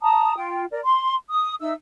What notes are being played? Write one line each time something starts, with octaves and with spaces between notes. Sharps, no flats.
A5 A#5 D#6
F4 G5
A#4 D5
C6
D#6
D#4 E5 E6